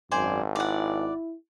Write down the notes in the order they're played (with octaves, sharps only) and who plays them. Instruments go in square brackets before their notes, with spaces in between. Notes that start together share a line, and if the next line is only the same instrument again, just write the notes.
[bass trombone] G#1 [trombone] F#2 [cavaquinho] C5 D5 G#5
[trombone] E4 [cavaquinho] D5 F#5